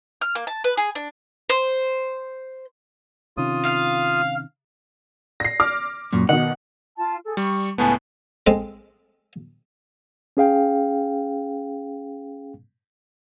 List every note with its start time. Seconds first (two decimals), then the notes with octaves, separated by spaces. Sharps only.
0.22 F6
0.35 A#3
0.47 A5
0.64 B4
0.77 G#4
0.95 D4
1.50 C5
3.37 C3 D#3 C#4 F4 D#6
3.65 F5
5.40 A#6 C7
5.60 D6 F6
6.13 F#2 A#2
6.29 B2 D#3 F#5
6.97 F4 A5
7.24 G#4 A4
7.37 G3 C#6
7.78 C#2 A2 B3 G#5 A5
8.47 G#3 C4 A4
10.37 C#4 G#4 F5 G5